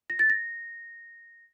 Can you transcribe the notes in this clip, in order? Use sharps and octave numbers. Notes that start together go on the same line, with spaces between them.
A#6
A6
A#6